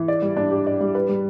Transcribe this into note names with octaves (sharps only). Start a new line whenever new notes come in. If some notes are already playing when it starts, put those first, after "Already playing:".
Already playing: E3
D5
G3
D4
G4
D5
G3
B4
G3